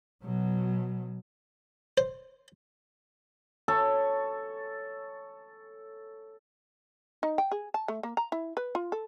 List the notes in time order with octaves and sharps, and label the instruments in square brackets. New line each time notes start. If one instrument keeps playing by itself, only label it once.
[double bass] B2 F#3
[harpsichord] C5
[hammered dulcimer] A4 C#5
[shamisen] D#4
G5
G#4
A5
A3
A#3
A#5
E4
B4
F4
A4